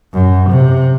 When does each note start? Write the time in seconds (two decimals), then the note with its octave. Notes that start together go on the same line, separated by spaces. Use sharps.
0.13 F#2
0.49 C3